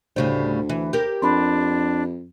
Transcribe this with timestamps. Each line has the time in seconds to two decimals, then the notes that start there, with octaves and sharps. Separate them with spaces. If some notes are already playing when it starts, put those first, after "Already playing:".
0.16 D2 A2 C#3 G3 C5
0.69 E3
0.93 G4 A#4
1.22 F2 D4 B5 C6